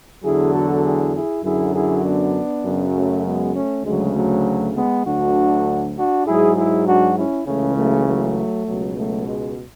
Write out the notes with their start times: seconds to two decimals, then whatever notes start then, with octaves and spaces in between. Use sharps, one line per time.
0.23 E2 D3 F#3 E4 G#4
0.53 F#4 A4
0.83 E4 G#4
1.14 E4 G#4
1.44 F#2 D3 F#3 E4 G#4
1.73 E4 G#4
2.04 B3 D4
2.64 F#2 C#3 F#3
2.94 A3 C#4
3.24 G#3 B3
3.54 A3 C#4
3.84 D2 C#3 F#3 G#3
4.14 F#3 A3
4.75 G#3 B3
5.05 D2 D3 F#3 D4 F#4
5.95 D4 F#4
6.25 G#2 F#3 E4 G#4
6.56 E4 G#4
6.85 D4 F#4
7.16 C#4 E4
7.45 C#2 C#3 E3 A3 C#4
7.76 F#3 A3
8.06 F#3 A3
8.66 C#2 B2 F#3
8.96 F#3 A3
9.26 G#3